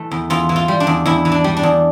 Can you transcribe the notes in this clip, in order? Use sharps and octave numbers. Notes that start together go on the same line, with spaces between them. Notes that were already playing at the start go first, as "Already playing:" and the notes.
Already playing: E3 A3
E2
E2 F4
E3
F4
G3
D4
E2
E2 E4
E3
D4
G3
D4
E2